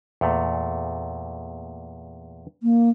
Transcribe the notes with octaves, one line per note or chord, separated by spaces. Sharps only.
E2 A#2 A3
A#3